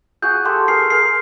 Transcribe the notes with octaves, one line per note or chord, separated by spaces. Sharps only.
F#4 G#4 G6
G4 A4 C6
G#4 A#4 C7
G#4 A#4 C7